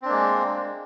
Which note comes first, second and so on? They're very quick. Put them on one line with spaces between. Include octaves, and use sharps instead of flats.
C4 D4 A#3 G#3